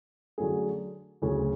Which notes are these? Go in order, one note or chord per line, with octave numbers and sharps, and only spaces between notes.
D3 F#3 A3 C#4 G#4
D2 C#3 F#3 C#4 G#4